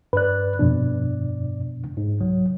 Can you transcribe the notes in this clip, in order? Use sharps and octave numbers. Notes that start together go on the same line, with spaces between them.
G2 B4 D5 F#6
F2 B2 D4
G#2
C2 F#3